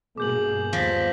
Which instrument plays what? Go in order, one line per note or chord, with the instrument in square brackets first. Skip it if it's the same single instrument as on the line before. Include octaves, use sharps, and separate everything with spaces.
[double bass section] G2 B2 A#3 [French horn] G#4 [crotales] D6 G6 F#7
[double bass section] D#2 G3 B3 [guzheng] F3 [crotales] G6 A#6 B6